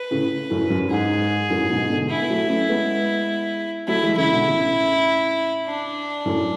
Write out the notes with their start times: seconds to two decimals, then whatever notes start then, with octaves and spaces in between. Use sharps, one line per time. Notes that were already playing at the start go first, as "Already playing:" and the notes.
Already playing: B4
0.11 A2 C#3
0.50 F#2 A2
0.70 F#2
0.90 G#2 G#4
1.50 F#2 A2
1.70 G#2 B2
1.90 B2 D3
2.09 E4
2.22 B3
2.30 F#3 A3
2.49 A3 C#4
2.69 G#3 B3
3.88 F#3 A3 E4
4.03 E3 G#3
4.17 C#3 E3 E4
4.33 B2 D3
4.47 A2 C#3
5.66 D4
6.25 F#2 A2